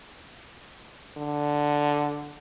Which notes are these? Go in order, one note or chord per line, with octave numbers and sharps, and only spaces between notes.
D3